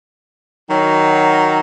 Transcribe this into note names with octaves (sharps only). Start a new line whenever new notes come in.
D#3 F#3